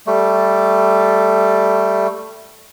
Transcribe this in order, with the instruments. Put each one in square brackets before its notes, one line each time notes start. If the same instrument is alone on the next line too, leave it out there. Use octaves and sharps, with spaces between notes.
[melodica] G3 A3